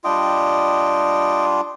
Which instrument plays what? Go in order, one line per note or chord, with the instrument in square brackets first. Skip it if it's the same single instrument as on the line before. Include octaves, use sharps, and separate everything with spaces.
[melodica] G3 D4 F4 D#5 G5